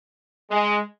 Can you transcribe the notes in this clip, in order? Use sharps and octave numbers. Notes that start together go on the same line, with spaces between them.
G#3